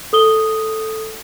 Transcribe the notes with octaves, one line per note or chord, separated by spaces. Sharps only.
A4 D#6 G7